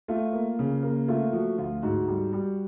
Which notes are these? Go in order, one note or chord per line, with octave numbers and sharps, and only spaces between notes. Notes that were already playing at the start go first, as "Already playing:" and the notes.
A3 F4
A#3
C#3
A#3
A3 F4
F3 F#4
D2 F4
G#2 F#4
G3
G3